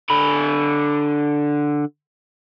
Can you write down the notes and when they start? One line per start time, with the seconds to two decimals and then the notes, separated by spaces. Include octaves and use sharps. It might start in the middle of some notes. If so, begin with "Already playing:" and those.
0.10 D3 B5